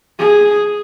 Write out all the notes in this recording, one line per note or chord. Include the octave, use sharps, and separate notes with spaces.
G#4